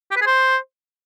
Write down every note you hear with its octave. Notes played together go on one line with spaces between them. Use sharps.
G4
B4
G#4
C5